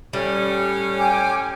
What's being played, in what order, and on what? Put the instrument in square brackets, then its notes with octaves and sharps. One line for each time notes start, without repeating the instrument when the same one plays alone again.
[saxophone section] A2 C#4 [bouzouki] G3
[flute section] G5 G#5 D6